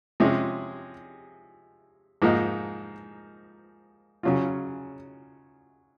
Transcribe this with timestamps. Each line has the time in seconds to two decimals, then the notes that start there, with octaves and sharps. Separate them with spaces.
0.20 C3 F3 G#3 C#4 G#4
2.22 G#2 F3 A#3 D#4
4.23 C#3 F#3 C#4 F4